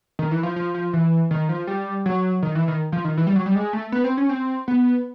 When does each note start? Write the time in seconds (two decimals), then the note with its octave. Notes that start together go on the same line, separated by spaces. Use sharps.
0.19 D#3
0.31 E3
0.43 F3
0.56 F3
0.75 F3
0.93 E3
1.31 D#3
1.49 F3
1.67 G3
2.06 F#3
2.43 D#3
2.55 E3
2.68 D#3
2.92 F3
3.04 D#3
3.17 E3
3.27 G3
3.36 F#3
3.46 G3
3.55 G#3
3.73 A3
3.92 B3
4.04 C4
4.17 C#4
4.29 C4
4.68 B3